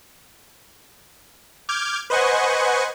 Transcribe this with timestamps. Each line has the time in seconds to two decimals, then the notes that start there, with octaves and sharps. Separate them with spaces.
1.69 D6 F6 G6 G#6
2.10 B4 C5 D#5 F#5 G#5 C#6